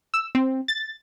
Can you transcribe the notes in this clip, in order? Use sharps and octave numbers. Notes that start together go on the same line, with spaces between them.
E6
C4
A6